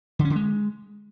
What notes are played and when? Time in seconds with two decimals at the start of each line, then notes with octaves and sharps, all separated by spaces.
0.19 D3
0.25 C#4
0.30 D3
0.36 G#3